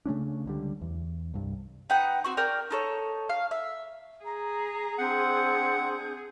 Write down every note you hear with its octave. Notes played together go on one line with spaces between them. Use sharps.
C#3 A3 C#4 D4
C#2 D3 G3
E2
C2 G2
D#4 B4 F#5 G5
C4 F#4 C#6
A#4 D5 G5
D#4 A4 C#5
F5
E5
G#4 A#5
C4 D4 F#5 G6